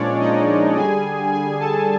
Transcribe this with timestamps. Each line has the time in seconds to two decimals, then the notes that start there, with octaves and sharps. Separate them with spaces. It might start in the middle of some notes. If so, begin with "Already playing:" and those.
Already playing: A#2 F3 G#3 C#4 D4 C#5 D5
0.20 D#4 D#5
0.76 D3 G3 G#4 G#5
1.33 G#4 G#5
1.60 A4 A5